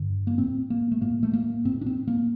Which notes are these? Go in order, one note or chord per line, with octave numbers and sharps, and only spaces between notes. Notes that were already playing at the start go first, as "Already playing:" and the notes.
Already playing: G2 D3
A#3
A2 C4
A#3
A3
A2 A#3
A3
A#3
A2 C4
D4
C4
A#3